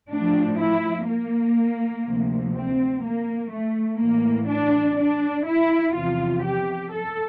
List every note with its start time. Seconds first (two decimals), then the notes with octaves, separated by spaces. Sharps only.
0.11 A2 F3 D4
0.60 E4
1.09 A#3
2.06 D2 C3 F3
2.54 C4
3.04 A#3
3.52 A3
4.00 A2 E3 A#3
4.49 D4
4.98 D4
5.46 E4
5.95 E2 C3 F3 F4
6.44 G4
6.92 A4